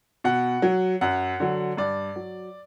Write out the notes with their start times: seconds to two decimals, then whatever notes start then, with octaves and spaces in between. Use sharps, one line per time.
0.24 B2 F#5
0.62 F#3
1.01 F#2 F#5
1.40 D3 F#3
1.77 G2 D5
2.16 F#3